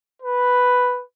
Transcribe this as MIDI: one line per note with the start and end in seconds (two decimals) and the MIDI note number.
0.22 1.02 71